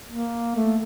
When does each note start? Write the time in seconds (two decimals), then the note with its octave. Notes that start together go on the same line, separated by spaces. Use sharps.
0.09 A#3
0.55 A3